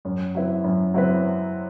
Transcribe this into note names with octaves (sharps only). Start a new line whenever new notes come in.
F#2
F#3 C4 E4 B4
F#2
F#3 C4 E4 B4